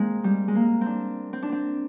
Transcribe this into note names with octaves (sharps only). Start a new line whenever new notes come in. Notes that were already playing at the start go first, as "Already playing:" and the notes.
Already playing: G#3 A#3 C4
G3
G#3
A#3
C4 D4
C4
D4
C4